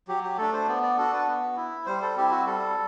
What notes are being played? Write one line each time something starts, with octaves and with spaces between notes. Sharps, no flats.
F#3 G4
G4
A3 D4 A4
C5
B3 D5
D5
D4 F#4 A4
B4
B3
E4
G3 C5
A4
C4 E4 G4
F#4
G3 A4